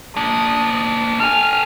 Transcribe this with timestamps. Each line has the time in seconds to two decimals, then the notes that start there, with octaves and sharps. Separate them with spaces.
0.16 A#3 D4 D#6
1.20 A4 G#5 F6